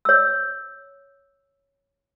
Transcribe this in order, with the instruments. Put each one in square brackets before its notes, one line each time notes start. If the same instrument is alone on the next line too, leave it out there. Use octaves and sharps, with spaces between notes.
[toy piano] C#5 E6